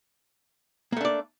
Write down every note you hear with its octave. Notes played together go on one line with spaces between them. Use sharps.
A3 A#3 D4 D5